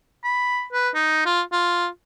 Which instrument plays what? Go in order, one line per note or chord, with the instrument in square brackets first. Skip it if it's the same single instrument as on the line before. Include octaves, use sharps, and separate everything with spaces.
[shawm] B5
B4
D#4
F4
F4